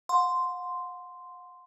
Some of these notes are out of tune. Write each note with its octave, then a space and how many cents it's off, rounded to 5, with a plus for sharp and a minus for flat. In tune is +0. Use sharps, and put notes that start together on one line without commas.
F#5 -40 C6 -5